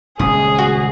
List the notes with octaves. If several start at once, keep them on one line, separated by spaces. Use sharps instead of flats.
D#1 C#2 C#4 G#4 D#6
F#4